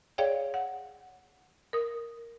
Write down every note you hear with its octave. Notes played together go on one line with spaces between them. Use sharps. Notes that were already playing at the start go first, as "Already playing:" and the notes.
G#4 C#5 D5 F5 G5
F#5
A#4 D#6